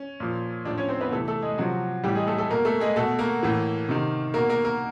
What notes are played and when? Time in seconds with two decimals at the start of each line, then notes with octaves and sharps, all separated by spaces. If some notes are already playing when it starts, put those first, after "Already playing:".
Already playing: C#4
0.20 A#2 F3
0.65 A2 F3 D4 D5
0.78 C#4 C#5
0.88 C4 C5
1.01 B3 B4
1.12 C3 E3 A3 A4
1.28 A3 A4
1.42 G#3 G#4
1.58 C3 F3 F#3 F#4
2.04 A2 E3 G3 G4
2.15 G#3 G#4
2.27 A3 A4
2.38 A3 A4
2.50 B2 A#3 A#4
2.65 A3 A4
2.80 G#3 G#4
2.96 B2 A3 A4
3.19 A#3 A#4
3.43 A2 E3
3.89 C3 D#3
4.34 B2 A#3 A#4
4.49 A#3 A#4
4.65 A#3 A#4